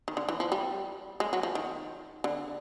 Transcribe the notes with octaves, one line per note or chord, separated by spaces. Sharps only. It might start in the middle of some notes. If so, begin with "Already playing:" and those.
D#3
D3
E3
F3
G3
G#3
F#3
F3
D#3
D3